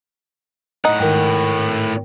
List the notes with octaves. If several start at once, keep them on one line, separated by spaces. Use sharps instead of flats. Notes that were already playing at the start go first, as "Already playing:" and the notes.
A2 D#4 F#5
G#2 D#3 A#4 G5